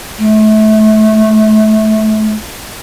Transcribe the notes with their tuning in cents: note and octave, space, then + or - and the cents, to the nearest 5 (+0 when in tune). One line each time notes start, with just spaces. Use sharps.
A3 -25